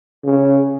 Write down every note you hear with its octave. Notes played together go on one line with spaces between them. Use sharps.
C#3